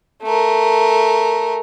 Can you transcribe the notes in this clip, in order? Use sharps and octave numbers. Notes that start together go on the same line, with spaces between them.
A3 A#4